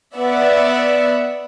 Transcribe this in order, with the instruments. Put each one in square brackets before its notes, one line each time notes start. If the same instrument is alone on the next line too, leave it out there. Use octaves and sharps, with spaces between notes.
[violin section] B3 D5 E5 F#5